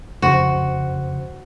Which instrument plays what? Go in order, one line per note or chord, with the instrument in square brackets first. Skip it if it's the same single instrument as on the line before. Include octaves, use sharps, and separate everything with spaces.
[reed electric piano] F2 C#3 C5 [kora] F#4